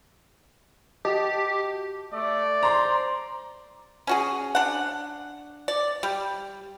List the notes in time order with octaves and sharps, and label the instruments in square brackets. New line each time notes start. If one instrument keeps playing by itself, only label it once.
[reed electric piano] F#4 D#5 A5 [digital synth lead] G4
[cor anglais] A3 [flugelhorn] D5
[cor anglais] C5 [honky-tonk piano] A#5 C6
[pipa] C#4 F#4 G#4
D4 F#5
D5
G3